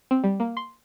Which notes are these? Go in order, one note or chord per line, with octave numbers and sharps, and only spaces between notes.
C4
G3
A#3
C6